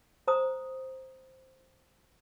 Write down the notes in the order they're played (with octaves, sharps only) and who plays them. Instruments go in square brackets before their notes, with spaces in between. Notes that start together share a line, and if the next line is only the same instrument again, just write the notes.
[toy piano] C5 A#5 D#6